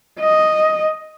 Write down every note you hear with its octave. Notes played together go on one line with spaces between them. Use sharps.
D#5